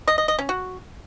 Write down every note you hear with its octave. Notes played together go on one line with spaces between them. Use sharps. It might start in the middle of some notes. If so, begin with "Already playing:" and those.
D#5
D#5
D#5
C#4
F#4